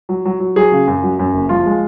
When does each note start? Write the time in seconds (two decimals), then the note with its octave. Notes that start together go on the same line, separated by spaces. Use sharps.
0.09 F#3
0.25 F#3
0.40 F#3
0.56 F#3 G#4
0.72 C#3
0.88 F#2
1.03 F#3
1.19 F#2
1.34 F#1
1.49 F3 F4
1.66 G#3